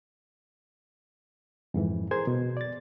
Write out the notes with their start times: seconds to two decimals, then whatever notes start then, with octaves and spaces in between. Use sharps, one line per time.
1.74 F2 G#2 E3
2.11 G#4 A#4 C5 C6 G#6
2.27 B2
2.57 D5 A6